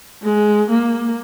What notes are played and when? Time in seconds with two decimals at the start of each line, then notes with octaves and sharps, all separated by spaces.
0.23 G#3
0.70 A#3